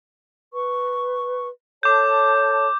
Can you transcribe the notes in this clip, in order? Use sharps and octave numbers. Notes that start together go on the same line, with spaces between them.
B4 C#6
A4 C#5 A5 D6 G6